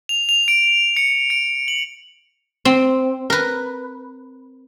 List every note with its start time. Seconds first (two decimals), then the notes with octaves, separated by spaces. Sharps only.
0.09 F7
0.29 F7
0.48 D7
0.97 C#7
1.30 D7
1.68 F#7
2.65 C4
3.30 A#4 B4